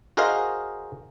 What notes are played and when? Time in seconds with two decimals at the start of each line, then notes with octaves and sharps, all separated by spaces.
0.17 F#4 G#4 A#4 C5 D#5 F5